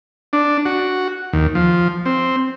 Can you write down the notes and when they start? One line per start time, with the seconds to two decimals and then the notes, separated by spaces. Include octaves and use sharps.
0.33 D4
0.66 F#4
1.33 D#2
1.55 F3
2.06 C4